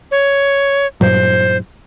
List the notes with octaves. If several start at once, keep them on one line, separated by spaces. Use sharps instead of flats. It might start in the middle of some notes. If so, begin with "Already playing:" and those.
C#5
G2 A#2 F#3 C5